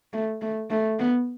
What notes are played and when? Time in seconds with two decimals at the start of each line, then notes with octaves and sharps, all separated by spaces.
0.13 A3
0.42 A3
0.70 A3
0.99 B3